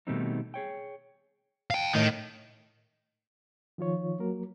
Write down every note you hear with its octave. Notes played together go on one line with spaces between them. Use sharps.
B2 D#3 G3 A3 C4 D#4
G#4 C#5 G5
F5 G5
A2 D#3
D#3 F3 F4 C#5
F#3 A#3 A#4